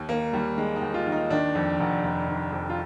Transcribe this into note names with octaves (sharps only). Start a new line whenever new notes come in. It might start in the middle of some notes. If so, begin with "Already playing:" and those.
Already playing: D#2
D#3 A#3
D#2 G3
D#3 G#3
D#4
D#2
F4
D#3
D#4
D#3 D4
F2
F1
F1
D#3
F2
F4